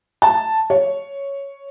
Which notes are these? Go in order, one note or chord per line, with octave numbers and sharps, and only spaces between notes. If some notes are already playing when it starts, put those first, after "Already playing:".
A5
C#5